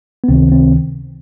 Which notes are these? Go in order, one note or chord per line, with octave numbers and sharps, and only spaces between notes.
B3
C#2 C3 D#3 C4
C4